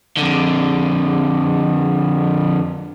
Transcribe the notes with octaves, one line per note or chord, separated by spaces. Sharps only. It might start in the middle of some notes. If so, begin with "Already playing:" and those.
F2 D3